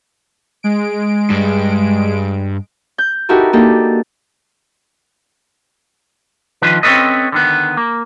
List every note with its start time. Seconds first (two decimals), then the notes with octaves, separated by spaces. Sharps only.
0.63 G#3 D7
1.30 G2
2.98 G6
3.29 D#4 E4 F#4 G4 A4 A#4
3.53 A#3 D4 D#4 G4 A4
6.62 D3 D#3 F3 B4
6.83 C4 C#4 D#4 A4 B4 D#5
7.32 D3 D#3 B3
7.77 A#3